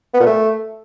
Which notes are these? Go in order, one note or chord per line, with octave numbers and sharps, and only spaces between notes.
B3
A#2
A3